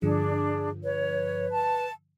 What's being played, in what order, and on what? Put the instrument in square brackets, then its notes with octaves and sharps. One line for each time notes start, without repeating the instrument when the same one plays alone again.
[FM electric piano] G2 D3 F3 [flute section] D4 [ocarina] G#4
[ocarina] B4 [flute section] C#5
[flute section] A5